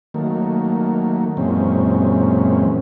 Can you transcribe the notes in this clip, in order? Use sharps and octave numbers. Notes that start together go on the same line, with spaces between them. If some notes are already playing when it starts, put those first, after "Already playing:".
D#3 F#3 A3 A#3
F#2 A#2 E3 G#3 C4 C#4